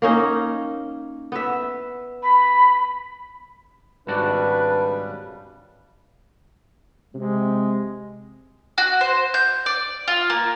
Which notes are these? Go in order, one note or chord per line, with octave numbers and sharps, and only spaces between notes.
A#3 C#4 D#4
B3 E5
B5
G#1 C#3 G3 D4 F#4 B4 D5
C3 G#3
F#4
C5
G6
D5
F4
A#3